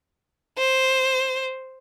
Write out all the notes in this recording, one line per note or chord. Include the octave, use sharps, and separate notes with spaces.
C5